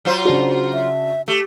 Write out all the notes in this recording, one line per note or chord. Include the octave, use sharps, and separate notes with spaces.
F#3 F4 C5
C#3 D4 F#4
E5
A3 G4